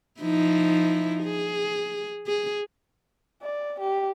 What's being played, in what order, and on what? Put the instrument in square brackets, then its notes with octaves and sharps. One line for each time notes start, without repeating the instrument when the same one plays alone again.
[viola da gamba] F3 D#4 E4
G#4
G#4
[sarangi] D5
G4